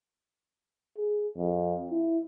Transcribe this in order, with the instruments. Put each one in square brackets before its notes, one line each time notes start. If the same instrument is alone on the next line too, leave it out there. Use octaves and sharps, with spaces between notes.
[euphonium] G#4
F2
E4